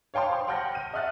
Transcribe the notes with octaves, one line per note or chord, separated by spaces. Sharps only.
C#5 F5 G5 A5 C6
C5 C6
F#5 G5 A5 F6 G6 A#6
D#7
D#5 E5 F#5 F6 F#6 A6